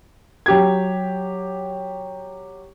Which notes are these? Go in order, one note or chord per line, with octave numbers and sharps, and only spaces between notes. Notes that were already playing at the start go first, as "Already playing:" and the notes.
F#3 G4 G#6